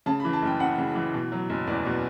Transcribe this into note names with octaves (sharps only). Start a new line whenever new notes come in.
C#3 A5
B5
E3
A5
F#1
G5
F#2 F#5
C#3
E3
B2
F#3
F#1
E2 D5
B2